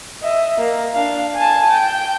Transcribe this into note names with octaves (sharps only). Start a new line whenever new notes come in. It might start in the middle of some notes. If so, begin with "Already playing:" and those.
D#5 E5
A#3
D4 F5
G#5 A5
G5